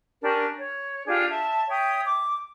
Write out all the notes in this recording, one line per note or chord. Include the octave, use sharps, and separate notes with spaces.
C#4 D4 G4 A#4
C#5
D4 F4 G4 G#4
E5 A5
C#5 E5 G5 D#6
D6